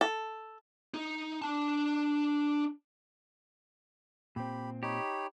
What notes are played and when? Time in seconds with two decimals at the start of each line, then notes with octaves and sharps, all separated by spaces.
0.01 A4
0.94 D#4
1.42 D4 A5
4.36 A#2 C4 G4 B5
4.83 D#4 G4 C#5 B5